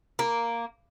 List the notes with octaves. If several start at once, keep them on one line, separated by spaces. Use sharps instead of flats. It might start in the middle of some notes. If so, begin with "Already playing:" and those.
A#3